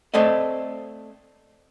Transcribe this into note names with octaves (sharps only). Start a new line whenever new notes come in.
A3 C4 A4 D5 D#5